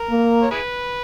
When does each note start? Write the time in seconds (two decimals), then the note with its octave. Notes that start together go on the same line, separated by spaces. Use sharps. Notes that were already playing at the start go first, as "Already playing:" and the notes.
Already playing: A#4
0.10 A#3
0.42 C#5
0.51 E4 G#4 B4